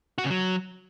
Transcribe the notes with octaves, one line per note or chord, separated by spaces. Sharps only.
F#4
C#3
F#3